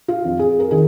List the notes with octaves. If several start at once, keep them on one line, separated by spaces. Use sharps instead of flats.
F4
F2
G#4
A#4
D#3 G#4